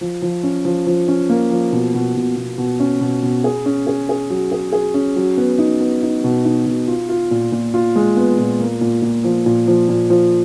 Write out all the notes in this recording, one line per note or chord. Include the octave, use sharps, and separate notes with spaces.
F3
F3
C#4
F3
F3
C#4
A#3
F3
B2
B2
B2
B2
B2
C#4
B2
B2
G#4
C#4
G#4
G#4
F#3
G#4
G#4
C#4
F#3
B3
D#4
B3
D#4
B2
D#4
B2
F4
F4
A#2
A#2
F4
G#3
B3
A#2
A#3
A#2
A#2
F3
A#2
F3
A#2
F3